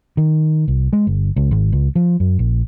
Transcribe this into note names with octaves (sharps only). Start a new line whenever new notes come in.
D#3
C2
G#3
G1
C#2
G#1
C#2
F3
F#2
A#1